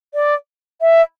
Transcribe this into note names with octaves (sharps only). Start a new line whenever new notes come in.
D5
E5